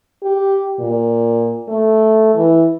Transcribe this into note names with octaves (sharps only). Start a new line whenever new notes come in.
G4
A#2
A3
E3